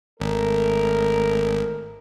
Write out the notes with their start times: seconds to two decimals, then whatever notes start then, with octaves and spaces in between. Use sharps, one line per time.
0.20 G#1 A3 A#4